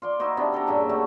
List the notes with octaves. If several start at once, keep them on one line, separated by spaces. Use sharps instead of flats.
F4 D5 C6
D#4 E4 F#4 C5
C3 B3 D4
D4 A4 G5 A#5
G2 A#2 C#3 E5
G3 A3 C#4 F#4